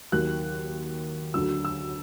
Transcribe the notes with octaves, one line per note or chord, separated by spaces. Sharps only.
D#2 D#3 F#3 F#6
D2 D3 F#3 E6
E6